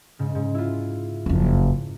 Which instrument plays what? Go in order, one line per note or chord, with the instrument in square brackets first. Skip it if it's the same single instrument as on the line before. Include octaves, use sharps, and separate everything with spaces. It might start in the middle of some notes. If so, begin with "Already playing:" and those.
[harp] G#2 C#3
G#2
E4 F4
[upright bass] F#1 F2